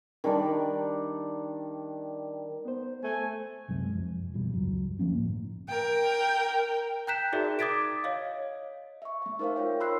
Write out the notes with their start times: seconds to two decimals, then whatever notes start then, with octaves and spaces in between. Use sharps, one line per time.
0.24 D#3 G3 D4 D5
2.65 B3 C5
3.03 A3 G#5
3.68 C2 F#2 C3 G#3
3.93 F2
4.34 F2 B2 E3 G3
4.53 C#2 G2 F#3
4.99 F#1 F3 A#3 C#4
5.16 G1 A2
5.69 A#4 G5
7.07 G5 A#5 F#6 G6 B6 E7
7.33 D#4 F#4 G#4 A#4 D5 E5
7.59 D6 D#6 G#6 A6 B6 D7
8.04 C#5 D#5 F5
9.02 E5 C#6
9.22 A3 E5
9.39 D#4 A#4 C5 E5 F5
9.56 F4 C#5 G5
9.80 B5 C6 E6 F#6 C7